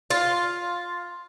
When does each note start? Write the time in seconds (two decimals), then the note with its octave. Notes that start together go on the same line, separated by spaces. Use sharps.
0.10 F4